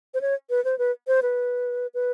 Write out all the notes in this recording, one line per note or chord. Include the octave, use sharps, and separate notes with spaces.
C5
C#5
B4
C5
B4
C5
B4
B4